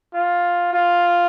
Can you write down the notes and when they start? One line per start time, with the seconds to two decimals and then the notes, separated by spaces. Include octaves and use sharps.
0.13 F4
0.73 F4